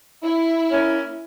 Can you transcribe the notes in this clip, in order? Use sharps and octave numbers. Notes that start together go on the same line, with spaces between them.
E4
A#3 C#4